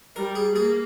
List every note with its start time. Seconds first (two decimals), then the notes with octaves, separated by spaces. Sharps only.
0.16 G3 A#4
0.35 G#4
0.56 A#3 G#4